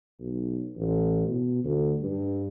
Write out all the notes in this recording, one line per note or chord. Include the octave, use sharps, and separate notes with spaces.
B1
A1
B2
D2
G2